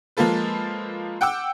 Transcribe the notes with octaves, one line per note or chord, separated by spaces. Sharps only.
F3 G#3 A#3 F4 A4 B4
F#5 G5 D6 E6